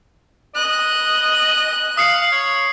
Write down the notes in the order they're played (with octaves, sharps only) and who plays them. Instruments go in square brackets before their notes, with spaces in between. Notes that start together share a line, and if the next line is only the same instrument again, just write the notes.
[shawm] D#5 [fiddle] F#6
[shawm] F5 [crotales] D#6 C7 C#7
[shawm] C#5